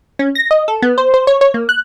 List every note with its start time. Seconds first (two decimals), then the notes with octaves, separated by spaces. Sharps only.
0.19 C#4
0.35 A#6
0.51 D#5
0.68 A4
0.82 B3
0.98 C5
1.14 C5
1.27 C#5
1.41 C#5
1.54 A#3
1.69 F#6